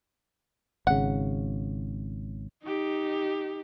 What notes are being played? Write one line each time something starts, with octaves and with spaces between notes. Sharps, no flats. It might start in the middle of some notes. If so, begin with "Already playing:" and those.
G#1 C#3 F#5
D#4 G4